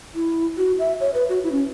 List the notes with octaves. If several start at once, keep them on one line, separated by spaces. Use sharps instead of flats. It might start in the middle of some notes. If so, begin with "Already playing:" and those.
E4
F#4
E5
C#5
B4
F#4
E4
C#4